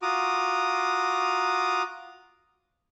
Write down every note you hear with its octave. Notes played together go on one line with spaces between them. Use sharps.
F4 F#4 A#5 D6 D#6